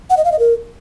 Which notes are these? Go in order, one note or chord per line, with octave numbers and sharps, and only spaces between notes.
F#5
D#5
F5
D#5
A#4